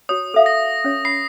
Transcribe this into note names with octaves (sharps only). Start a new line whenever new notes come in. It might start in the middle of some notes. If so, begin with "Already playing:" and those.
F#4 C#5 D#6
A4 E5 F5
A#6
C#4 C#5
B5 C7